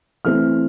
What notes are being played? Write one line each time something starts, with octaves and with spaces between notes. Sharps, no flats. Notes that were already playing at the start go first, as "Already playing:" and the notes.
E3 A3 C4 F6